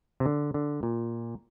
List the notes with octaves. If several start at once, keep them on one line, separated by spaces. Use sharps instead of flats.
C3
D3
D3
A#2